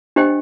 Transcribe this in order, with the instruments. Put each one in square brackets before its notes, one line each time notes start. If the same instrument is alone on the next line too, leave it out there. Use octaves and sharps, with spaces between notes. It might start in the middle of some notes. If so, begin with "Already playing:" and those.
[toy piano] D4 G4 C5 D#5 G5